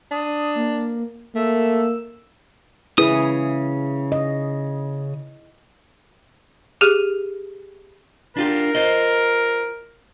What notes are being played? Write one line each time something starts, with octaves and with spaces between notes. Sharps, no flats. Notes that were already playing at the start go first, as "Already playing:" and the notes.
D4 D#6
A#3
A3 A#3 E6
C#3 E4 G#4 B4 D#6
D#5
G4 G#4 F6 F#6 D#7
D4 F4 G4 A#4
F4 C5 D#5